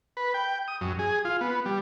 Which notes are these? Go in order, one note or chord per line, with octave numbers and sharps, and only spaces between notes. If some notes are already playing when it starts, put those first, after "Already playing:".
B4
G5
D#6
F#2
G#4
F4
B3
G3